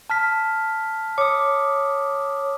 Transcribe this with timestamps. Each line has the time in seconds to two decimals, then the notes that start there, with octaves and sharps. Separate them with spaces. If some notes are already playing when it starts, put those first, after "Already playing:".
0.10 A5 F6 B6
1.18 C#5 D6 D#6